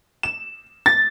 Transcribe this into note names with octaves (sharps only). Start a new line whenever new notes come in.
E7
A6